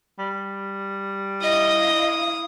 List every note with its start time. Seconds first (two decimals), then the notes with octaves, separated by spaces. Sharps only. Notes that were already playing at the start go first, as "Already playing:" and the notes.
0.19 G3
1.43 E4 D#5 F5 D#6